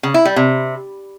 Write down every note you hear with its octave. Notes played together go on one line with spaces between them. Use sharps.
C#3
E4
G3
C3